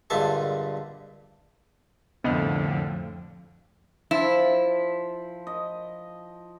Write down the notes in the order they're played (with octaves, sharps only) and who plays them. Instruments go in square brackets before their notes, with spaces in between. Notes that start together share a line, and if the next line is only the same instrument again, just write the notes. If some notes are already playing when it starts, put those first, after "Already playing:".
[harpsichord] G2 A#2 D3 G#3 E5 A5
[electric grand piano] C2 [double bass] F2 A2 [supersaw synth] D3 [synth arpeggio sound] B3 D#5 F5
[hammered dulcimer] F3 [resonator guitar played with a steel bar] E4
[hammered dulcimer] D#5